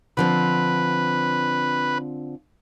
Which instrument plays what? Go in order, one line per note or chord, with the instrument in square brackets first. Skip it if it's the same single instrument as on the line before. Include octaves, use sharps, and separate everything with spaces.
[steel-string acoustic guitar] D3 F3 C4 [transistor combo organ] B4